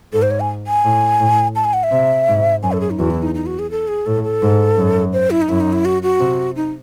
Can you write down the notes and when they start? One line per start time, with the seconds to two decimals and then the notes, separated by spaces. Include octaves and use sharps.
0.13 G#2 A4
0.22 C5
0.31 C#5
0.40 G#5
0.67 G#5
0.85 A2
1.20 A2
1.56 A5
1.65 G#5
1.73 F#5
1.83 E5
1.91 C3
2.28 G#2
2.63 F#2 G#5
2.72 A4
2.80 G#4
2.90 D#4
2.99 E2 F#4
3.10 E4
3.22 D#4
3.35 D#4
3.46 F#4
3.59 G#4
3.71 A4
3.88 G#4
4.06 A2 A4
4.24 A4
4.42 G#2
4.77 F#2
5.13 C5
5.31 E4
5.42 D#4
5.49 F#2 E4
5.60 D#4
5.73 E4
5.85 F#4
6.03 F#4
6.20 C3
6.56 D#4